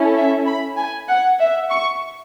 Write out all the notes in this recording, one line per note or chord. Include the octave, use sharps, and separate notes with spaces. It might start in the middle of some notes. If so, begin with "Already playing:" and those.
Already playing: C#4 E4 A4
E5
B5
G#5
F#5
E5
C#6